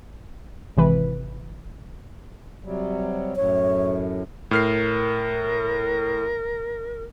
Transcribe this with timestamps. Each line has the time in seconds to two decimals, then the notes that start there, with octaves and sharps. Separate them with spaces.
0.77 G#1 C3 E3 B4
2.64 C3 F#3 G3
3.36 F#2 A2 C#5
4.51 A2 A#4 F6 C7